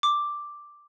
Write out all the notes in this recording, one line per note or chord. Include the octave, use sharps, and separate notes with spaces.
D6